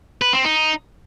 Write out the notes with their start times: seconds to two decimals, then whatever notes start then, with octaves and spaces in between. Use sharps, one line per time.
0.22 B4
0.33 C4
0.44 D#4